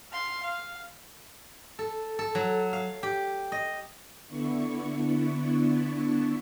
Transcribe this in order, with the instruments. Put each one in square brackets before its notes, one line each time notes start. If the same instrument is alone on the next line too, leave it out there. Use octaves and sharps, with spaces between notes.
[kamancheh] F5 C6
F5
[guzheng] A4
A4
F#3
F5
G4
D#5
[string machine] D3 B3 D4 E4 C#6